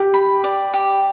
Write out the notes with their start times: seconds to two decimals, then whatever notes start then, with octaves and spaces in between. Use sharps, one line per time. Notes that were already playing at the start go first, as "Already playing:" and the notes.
Already playing: G4 G5
0.14 B5
0.44 D5
0.74 G4